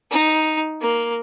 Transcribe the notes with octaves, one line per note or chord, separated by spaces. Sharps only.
D#4
A#3